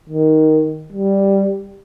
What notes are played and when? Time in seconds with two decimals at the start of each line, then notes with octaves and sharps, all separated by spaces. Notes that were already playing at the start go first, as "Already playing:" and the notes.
0.09 D#3
0.92 G3